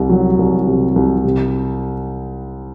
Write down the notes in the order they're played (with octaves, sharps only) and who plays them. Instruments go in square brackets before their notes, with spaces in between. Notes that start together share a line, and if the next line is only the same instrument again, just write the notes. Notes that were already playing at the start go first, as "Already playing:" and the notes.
Already playing: [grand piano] C2 C3
F#3
C2
C3
C2
C3